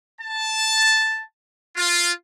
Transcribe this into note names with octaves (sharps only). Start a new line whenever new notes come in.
A5
F4